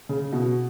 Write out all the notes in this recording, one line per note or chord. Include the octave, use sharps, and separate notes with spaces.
C#3
B2